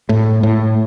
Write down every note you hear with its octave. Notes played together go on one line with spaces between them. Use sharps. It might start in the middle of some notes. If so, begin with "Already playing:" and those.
A2
A2